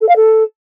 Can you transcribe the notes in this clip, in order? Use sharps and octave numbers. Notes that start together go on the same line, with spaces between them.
A4
F5
A4